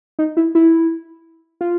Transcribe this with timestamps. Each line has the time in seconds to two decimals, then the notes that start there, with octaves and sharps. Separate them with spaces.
0.19 D#4
0.37 E4
0.55 E4
1.61 F4